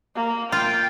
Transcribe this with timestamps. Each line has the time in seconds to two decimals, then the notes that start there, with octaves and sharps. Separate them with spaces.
0.16 A#3
0.52 F4 G5